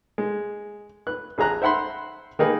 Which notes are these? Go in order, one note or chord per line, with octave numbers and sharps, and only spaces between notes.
G#3
B4 F#6
A1 G#4 A#5 F#6
C5 E5 F#5 B5 C6
D#3 A#3 D#4 G#4 B4